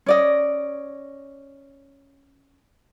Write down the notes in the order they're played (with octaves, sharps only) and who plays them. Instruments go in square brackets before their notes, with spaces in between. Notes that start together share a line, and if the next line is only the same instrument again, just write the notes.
[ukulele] C#4 D5 D#5